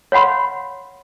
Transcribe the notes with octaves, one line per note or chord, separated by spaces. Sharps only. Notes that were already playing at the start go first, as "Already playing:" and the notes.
C#5 F5 F#5 B5 C6